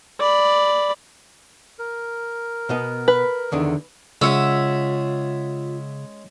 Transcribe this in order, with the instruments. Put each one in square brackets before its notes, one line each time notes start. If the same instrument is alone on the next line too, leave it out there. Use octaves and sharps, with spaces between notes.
[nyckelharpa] D5 B5
[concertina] A#4
[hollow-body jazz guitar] B2 B3 D#5
[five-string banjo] B4
[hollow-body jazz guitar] E2 D3 D#3
[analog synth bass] C#3 [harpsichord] G#3 C#4 [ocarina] F4 [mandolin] E5 F#5 E6